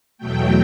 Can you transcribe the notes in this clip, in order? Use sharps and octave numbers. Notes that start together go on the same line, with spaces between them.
E2 B2 F#3 A3 G5